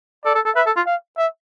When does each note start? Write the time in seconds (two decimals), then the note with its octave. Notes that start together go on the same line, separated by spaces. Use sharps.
0.25 A4 D5
0.35 A4
0.45 A4
0.55 B4 E5
0.66 A4
0.76 F4
0.86 F5
1.18 E5